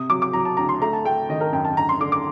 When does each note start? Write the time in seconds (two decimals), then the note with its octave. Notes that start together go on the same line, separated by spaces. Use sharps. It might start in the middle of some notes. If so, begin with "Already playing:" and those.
Already playing: C3 D#6
0.10 F#3 D6
0.22 D6
0.33 F#3 A#5
0.45 A5
0.57 D2 A#5
0.69 C6
0.81 A3 A#5
0.93 A5
1.05 A3 G5
1.29 D#3 D#5
1.40 A#4
1.52 F#2 G5
1.65 A5
1.76 D2 A#5
1.89 C6
2.00 D3 D6
2.12 D6